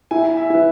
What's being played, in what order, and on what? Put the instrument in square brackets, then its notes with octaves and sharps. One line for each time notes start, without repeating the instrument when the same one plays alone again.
[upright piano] E4 [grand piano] G#5
[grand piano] E5
[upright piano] E4 [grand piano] B4